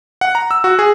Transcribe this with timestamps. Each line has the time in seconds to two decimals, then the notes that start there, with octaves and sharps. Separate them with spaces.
0.21 F#5
0.35 A#5
0.51 E6
0.64 F#4
0.79 G#4